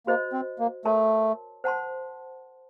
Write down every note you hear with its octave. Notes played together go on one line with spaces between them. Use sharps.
A#3 F#4 C5 D#5
C4
A#3
A3 A#4 C#5 A5 C6
C5 F#5 A5 C6